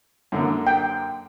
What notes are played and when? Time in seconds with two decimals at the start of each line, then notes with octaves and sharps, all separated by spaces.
0.32 F#2 D3 A#3
0.67 G5